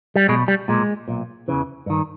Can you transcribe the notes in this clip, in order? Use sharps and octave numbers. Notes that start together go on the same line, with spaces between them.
G3
B1 B2 G#3
G3
B1 A#2 G#3
B1 A#2
E2 C#3 E3
G2 D#3